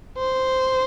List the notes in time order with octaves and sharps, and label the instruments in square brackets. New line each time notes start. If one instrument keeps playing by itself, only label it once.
[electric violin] C5